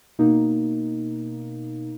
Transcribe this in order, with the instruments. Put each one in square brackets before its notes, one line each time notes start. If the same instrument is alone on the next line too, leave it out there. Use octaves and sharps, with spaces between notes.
[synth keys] B2 A#3 D#4